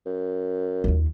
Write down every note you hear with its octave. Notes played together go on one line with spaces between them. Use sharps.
F#2
D#2 F4